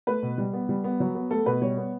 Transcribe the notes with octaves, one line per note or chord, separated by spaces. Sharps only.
A3 B4
B2
G3
B3
G3
B3
F#3
B3
A3 A4
B2 B4
G3 C#5
B3